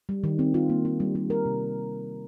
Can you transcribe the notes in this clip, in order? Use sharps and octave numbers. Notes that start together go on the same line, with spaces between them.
G3
D#3
C4
F4
A#3
F4
G3
G3
A#4
C3